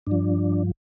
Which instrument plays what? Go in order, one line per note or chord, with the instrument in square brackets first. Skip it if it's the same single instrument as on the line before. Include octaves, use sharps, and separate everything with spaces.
[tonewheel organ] G2 F3 D4